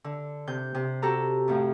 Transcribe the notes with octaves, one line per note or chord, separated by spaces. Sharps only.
D3
C3 G6
C3
F#4 G4 A4 A#5
F2 A2 F3